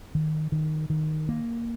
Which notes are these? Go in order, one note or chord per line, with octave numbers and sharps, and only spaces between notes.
D#3
D#3
D#3
A#3